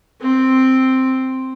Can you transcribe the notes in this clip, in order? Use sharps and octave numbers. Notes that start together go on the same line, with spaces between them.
C4